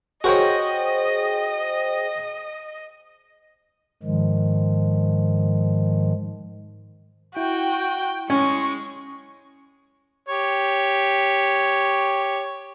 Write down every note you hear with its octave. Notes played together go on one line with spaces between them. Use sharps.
F#4 G#4 A#4 C5 C#5 D#5 G5
G#2 D#3 F3 G#3
E4 F#4 G5
G#3 C#4 C#6
G4 C#5